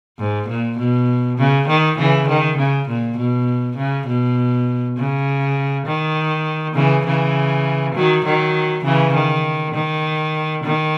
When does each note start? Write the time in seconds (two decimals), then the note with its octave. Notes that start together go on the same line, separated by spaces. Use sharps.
0.19 G#2
0.49 A#2
0.78 B2
1.38 C#3
1.68 D#3
1.98 C#3 E3
2.29 D#3
2.58 C#3
2.88 A#2
3.18 B2
3.77 C#3
4.07 B2
4.97 C#3
5.86 D#3
6.75 C#3 E3
7.06 C#3 E3
7.95 D#3 F#3
8.25 D#3 F#3
8.85 C#3 E3
9.14 D#3
9.75 D#3
10.64 D#3